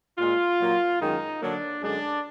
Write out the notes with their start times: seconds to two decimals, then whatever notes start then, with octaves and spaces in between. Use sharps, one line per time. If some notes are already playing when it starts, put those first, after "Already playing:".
0.18 A#2 G#3 F4
0.60 A#2 F#3 A#3
1.00 F#2 D#3 G#3 D#4
1.42 D3 F#3 A#3 D4
1.82 F#2 D3 G#3 D4